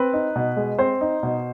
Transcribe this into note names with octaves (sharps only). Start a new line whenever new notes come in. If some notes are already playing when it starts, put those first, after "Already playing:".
Already playing: C4 B4
D#4
B2
G#3
C4 C5
D#4
B2